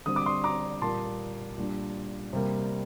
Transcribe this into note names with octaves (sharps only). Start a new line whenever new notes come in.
D3 G3 C4 D#6
D6
C6 D#6
A#5 D6
A#2 G3 A#3 A5 C6
A#2 G3 D4
C3 G3 A#3